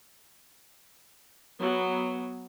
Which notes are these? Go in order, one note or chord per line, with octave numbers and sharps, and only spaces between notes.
F#3 B3